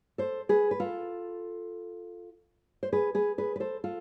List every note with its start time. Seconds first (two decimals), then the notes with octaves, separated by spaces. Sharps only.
0.18 A4 C5
0.49 G#4 B4
0.71 B4
0.80 F4 A4
2.83 C5
2.93 G#4 B4
3.15 G#4 B4
3.38 G#4 B4
3.56 B4
3.60 A4 C5
3.84 F4 A4